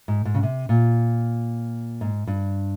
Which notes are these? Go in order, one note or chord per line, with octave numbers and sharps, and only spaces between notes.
G#2
G#2
C#3
C3
A#2
G#2
G2